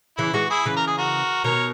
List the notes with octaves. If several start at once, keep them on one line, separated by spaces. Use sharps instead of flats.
C#3 E3 E4
E3 G#3 F#4
E4 G#4
C#3 E3 B4
A#4
G#4
F#4 A#4
B2 D#3 A#4 C#5